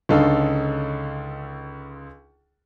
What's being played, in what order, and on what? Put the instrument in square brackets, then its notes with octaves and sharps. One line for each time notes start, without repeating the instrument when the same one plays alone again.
[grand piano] C#2 D3 C#4 D#4 A4 F5